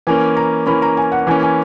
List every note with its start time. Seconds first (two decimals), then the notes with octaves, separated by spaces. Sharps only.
0.07 E3 A#3 C#4 G#5
0.37 A#5
0.66 E3 A#3 C#4 B5
0.82 A#5
0.97 G#5
1.12 F#5
1.27 E3 A#3 C#4 G#5
1.42 G#5